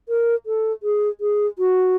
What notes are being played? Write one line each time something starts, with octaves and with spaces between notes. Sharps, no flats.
A#4
A4
G#4
G#4
F#4